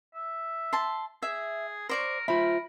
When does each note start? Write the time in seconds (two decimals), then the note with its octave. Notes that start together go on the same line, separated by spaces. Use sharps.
0.15 E5
0.73 A5 C6
1.22 G#4 E5
1.89 A#4 C5 D5 C#6
2.28 F4 A#4 C5 E5 B5